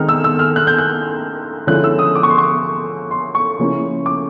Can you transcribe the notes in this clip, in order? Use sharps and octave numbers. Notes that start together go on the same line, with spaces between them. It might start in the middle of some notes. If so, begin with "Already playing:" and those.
Already playing: D#3 G#3 C4 D#4 F6
E6
E6
F6
F#6
G6
F#6
D3 F3 G#3 C#4 E4 F#6
E6
D#6
D6
C#6
C6
C#6
C6
C#6
C#3 F3 A#3 C#4 E4
D6